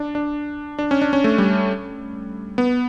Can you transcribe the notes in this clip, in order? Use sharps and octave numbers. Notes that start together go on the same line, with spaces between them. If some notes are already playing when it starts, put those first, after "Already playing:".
Already playing: D4
D4
D4
C#4
D4
C#4
A3
G3
B3